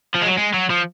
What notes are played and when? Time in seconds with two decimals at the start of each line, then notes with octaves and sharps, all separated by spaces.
0.14 F3
0.21 G#3
0.26 F#3
0.37 G#3
0.54 F#3
0.70 F3